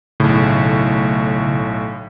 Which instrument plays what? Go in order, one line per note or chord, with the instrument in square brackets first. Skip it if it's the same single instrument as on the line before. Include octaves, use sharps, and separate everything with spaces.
[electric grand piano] B1 A2 [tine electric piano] C#3